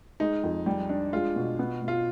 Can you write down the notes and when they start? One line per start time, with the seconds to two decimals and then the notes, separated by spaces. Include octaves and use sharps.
0.20 G#3 D#4
0.43 F2
0.66 G3
0.89 D4
1.12 G#3 F4
1.36 B2
1.59 B3
1.82 B2
1.88 F4